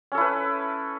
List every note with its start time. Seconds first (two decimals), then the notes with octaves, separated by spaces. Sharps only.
0.12 C#4
0.15 A4
0.18 E4
0.21 B4